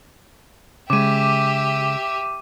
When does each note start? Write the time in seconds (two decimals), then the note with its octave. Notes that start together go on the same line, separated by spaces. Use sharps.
0.90 C#3 G#3 G4 E5 D6 D#7